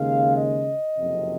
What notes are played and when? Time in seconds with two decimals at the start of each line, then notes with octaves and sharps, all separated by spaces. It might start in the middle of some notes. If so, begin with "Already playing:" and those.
Already playing: D#2 C#3 G#3 F5
0.37 D#5
0.97 F#1 F2 C3